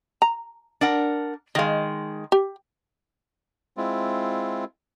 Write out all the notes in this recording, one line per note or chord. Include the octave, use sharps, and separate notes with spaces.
A#5
D4 A#4 F#5
D#3 G#3 D#5 F5
G4
G#3 C4 E4 F4